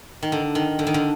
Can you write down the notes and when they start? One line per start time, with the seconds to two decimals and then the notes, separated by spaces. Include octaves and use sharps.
0.23 D#3
0.32 D3
0.55 D#3
0.79 D3
0.87 D#3
0.94 D3